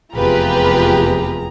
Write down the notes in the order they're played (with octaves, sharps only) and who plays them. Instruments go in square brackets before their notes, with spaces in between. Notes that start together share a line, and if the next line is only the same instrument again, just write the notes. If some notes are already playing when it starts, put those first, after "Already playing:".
[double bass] F1 E2 [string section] F4 G4 B4 [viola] G#4 A#5